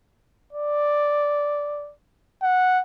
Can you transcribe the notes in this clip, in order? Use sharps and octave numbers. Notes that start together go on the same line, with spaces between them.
D5
F#5